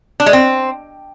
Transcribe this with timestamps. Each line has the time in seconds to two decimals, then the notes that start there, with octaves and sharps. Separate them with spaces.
0.20 D4
0.26 G#3
0.33 C4